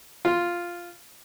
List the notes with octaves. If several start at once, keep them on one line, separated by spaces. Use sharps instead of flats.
F4